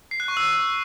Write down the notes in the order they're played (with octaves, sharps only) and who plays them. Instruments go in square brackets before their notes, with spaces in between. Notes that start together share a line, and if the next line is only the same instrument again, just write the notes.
[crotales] C7
F#6
C#6
E6
F#6